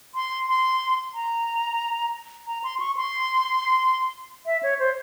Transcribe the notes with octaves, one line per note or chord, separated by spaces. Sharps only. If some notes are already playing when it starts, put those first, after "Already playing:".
C6
C6
A#5
A#5
C6
C#6
C6
E5
C#5
C5